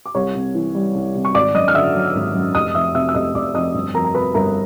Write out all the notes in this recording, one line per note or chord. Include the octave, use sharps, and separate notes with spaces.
D6
C2 C#5 C#6
C3
E3
G3
C2
C3
C#6
G#1 D5 D6
F#2 D#5 D#6
F6
D3 E5 E6
F#3
G#1
F#2
F1 D#5 D#6
F2 E5 E6
C3 E5 E6
E6
F1 D#5 D#6
F1 D5 D6
F2 D#5 D#6
G1
F2 A#4 A#5
A#5
C3 B4 B5
G1 A#4 A#5